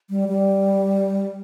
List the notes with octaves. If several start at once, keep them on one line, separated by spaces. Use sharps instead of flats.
G3
G3